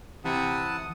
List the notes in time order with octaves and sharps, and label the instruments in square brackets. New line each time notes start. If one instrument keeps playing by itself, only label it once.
[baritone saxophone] C3 [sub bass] E3 [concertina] E4 F#5 A5 [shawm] D#6